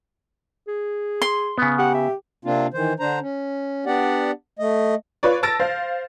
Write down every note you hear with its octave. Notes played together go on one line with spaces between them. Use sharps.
G#4
C6
C#3 B3
G4 F#5
E5
C3 A#3 C4 D4 F4
D#3 E3 C5
D3 D4 C5 A#5
C#4
B3 D4 G4 D5 F#5
A3 D#5
F4 B4 C#5 D5
A5 E6 A6 A#6 D7
C5 F5